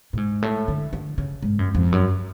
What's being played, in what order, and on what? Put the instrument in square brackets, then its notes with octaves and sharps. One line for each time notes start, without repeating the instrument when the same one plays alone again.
[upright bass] A2
G#2
A2
D3
D3
C#3
G#2
F#2
F2
F#2